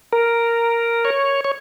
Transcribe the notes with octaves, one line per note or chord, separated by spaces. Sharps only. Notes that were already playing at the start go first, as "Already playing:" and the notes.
A#4
C#5
C#5